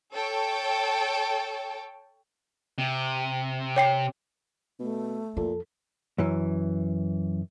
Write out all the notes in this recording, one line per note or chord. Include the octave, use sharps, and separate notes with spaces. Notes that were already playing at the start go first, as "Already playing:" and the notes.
A4 C#5 G5 A5
C3
C#5 G5 C7
B2 A3
F2 A#2 E4 A4
F#2 E3